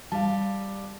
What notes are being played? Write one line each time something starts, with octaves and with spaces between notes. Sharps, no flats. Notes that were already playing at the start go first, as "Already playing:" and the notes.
G3 F5 A5